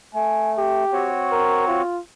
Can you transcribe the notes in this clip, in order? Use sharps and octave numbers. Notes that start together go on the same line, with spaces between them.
A3 G#5
G4
C4 F#4 C#5
A#4
F4